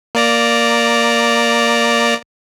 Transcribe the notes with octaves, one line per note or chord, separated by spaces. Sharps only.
A#3 D5 A#5